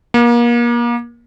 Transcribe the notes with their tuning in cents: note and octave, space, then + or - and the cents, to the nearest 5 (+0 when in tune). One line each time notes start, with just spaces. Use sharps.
A#3 +35